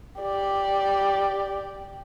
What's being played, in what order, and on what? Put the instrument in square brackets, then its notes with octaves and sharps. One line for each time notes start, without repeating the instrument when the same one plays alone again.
[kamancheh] G4 D5